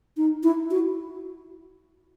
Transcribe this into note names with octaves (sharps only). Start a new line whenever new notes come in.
D#4
E4
F#4